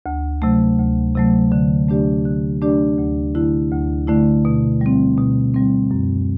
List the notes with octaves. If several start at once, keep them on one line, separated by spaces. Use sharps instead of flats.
D2
C3 F#3 A3
D2
C3 F#3 A3
D3
A3 D4 G4 D5
D3
A3 D4 G4 D5
D2
D3 A3 E4
D2
D3 A3 E4
B2
G3 C4
B2
G3 C4
F#2